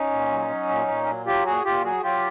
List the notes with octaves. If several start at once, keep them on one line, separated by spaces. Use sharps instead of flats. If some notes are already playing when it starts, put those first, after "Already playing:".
Already playing: C#4 D#4
A#2
F#3
F#3
A#2
A#2
F#3
F#3 F4 G4
A#2 F#4 G#4
A#2 F4 G4
F#3 F#4 G#4
F#3 F4 G4